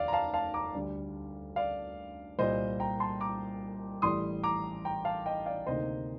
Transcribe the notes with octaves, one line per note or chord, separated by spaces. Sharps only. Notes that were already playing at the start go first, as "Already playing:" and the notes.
Already playing: F1 D#2 D5 F5
A#5
F5 A5
F5 A5
A#5 D6
D2 D3 G3
D5 F5
C2 A#2 G3 C5 D#5
G5 A#5
A5 C6
A#5 D6
A1 A2 G3 C6 D#6
A#5 D6
G5 A#5
F5 A5
D#5 G5
D5 F5
D2 C3 D#3 A#3 D#4 C5 D#5